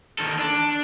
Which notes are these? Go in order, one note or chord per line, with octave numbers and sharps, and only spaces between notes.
D#3 A4
D4